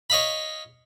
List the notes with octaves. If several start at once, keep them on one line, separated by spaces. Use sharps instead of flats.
C#5 D#5 F5 B5